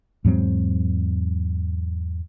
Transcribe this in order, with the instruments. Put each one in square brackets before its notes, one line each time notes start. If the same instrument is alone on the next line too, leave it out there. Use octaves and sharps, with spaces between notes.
[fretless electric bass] E2 G#2 F#3 C4